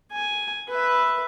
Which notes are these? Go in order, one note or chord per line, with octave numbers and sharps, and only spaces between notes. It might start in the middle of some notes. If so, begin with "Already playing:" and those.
G#5
B4 E5